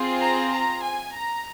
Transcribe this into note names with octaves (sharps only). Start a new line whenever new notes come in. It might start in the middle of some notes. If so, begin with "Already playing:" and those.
Already playing: C4 F4 G#4
A#5
A#5
G#5
A#5